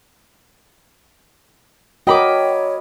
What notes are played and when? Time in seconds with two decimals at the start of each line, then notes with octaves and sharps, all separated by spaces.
2.07 F#4 A#4 C#5 D#5 G5 B5 D6